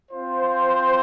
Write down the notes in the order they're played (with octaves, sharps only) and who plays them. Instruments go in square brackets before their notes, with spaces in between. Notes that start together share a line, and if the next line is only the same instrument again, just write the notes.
[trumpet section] C4 F4 C5